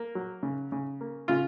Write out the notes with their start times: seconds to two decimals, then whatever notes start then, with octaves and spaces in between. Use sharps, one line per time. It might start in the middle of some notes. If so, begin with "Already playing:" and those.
Already playing: A#3
0.15 F#3
0.43 C#3
0.72 C#3
1.01 A#3
1.28 C#3 F4